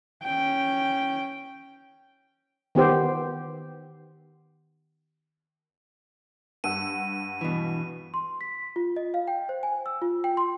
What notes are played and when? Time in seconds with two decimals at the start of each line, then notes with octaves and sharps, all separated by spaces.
0.23 C#4 G5
2.75 D#3 B3 G4 C5
6.64 G2 F#5 E6 D#7
7.41 B2 E3
8.14 C6
8.41 B6
8.76 F4
8.96 D#5
9.14 F5
9.28 G5
9.49 C5
9.63 G#5
9.86 E6
10.02 F4
10.24 G5
10.37 C6